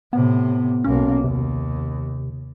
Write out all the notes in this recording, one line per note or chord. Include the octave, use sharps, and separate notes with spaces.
A2 C3 B3
B1 A#3 C#4
D#2 C3